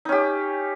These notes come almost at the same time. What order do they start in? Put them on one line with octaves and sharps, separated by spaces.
D#4 C#4 G4